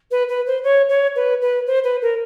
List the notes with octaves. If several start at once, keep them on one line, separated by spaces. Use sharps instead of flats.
B4
B4
C5
C#5
C#5
B4
B4
C5
B4
A#4